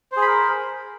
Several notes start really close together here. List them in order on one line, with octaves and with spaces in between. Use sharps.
C5 G#4 B5 A#4